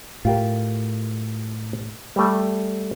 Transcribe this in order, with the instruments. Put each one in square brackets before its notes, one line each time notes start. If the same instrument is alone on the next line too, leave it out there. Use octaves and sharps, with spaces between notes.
[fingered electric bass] A2 [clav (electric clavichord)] F4 G4 A#4
[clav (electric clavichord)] G3 A3